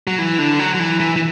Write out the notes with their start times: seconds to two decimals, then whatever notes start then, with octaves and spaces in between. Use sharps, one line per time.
0.07 F#3
0.18 E3
0.39 D3
0.59 F#3
0.74 F#3
0.79 E3
1.00 E3
1.16 E3